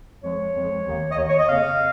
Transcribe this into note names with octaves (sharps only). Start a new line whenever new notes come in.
F2 F3 G#3 C#5
F2 F3 G#3
D#2 D#3 A#3
D#5
D#2 D#3 A#3 C#5
C#5
D#5
F2 C#3 A#3 F5